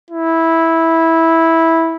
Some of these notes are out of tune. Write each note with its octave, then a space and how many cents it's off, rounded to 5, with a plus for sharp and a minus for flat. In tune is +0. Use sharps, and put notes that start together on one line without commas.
E4 -10